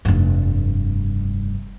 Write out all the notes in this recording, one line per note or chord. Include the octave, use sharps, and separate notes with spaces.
F1 G2